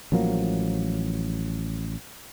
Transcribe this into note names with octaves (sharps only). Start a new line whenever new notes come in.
A1 F3 F#3 A#3